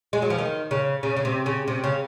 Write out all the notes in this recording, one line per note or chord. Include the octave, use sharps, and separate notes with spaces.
G#3
F#3
F3
D#3
C#3
C#3
C#3
C3
C#3
C3
C#3